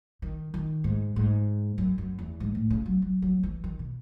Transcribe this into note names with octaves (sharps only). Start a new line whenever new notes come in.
D#3
D#3
G#2
G#2
F#2
F#2
E2
G#2
A2
C#3
F#3
F#3
F#3
E3
D#3
B2